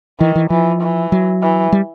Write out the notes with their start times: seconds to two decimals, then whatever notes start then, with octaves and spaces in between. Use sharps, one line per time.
0.20 D#3 E3
0.36 E3
0.50 E3 F3
0.81 E3
1.12 F#3
1.42 E3
1.72 G3